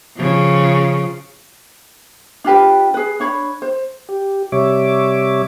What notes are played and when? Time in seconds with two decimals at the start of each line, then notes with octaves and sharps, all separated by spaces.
0.17 C#3 F3
2.44 D4 F4 G4 B4
2.94 G#4 B4
3.20 D4 C#5 B5
3.62 C5
4.09 G4
4.52 C3 G3 C#5 E5 D6